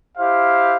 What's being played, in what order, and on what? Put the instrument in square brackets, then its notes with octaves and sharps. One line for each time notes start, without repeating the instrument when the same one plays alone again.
[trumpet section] E4 G4 C5 F5